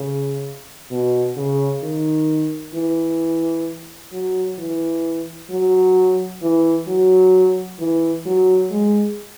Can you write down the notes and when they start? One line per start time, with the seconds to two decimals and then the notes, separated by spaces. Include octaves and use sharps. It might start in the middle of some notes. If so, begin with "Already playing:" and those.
Already playing: C#3
0.91 B2
1.37 C#3
1.83 D#3
2.75 E3
4.13 F#3
4.58 E3
5.50 F#3
6.42 E3
6.88 F#3
7.80 E3
8.26 F#3
8.71 G#3